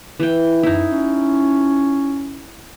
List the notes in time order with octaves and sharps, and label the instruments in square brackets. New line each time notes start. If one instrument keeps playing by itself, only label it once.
[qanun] E3 G5
[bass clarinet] F#2 [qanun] D#4 E4
[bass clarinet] C#4